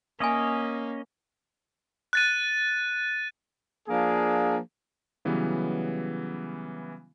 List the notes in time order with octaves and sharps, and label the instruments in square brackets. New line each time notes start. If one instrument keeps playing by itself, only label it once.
[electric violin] A#3 [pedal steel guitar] C#4 C#5 D#5 [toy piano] E5 G#5
[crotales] F#6 A6 D#7
[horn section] F3 A#3 D4 G#4
[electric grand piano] C#3 E3 F#3 G3 B3